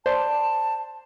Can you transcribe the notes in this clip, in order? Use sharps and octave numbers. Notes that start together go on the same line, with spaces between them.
C5 D5 A5